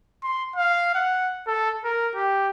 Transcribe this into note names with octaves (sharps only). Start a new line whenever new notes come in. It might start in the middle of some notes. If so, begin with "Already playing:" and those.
C6
F5
F#5
A4
A#4
G4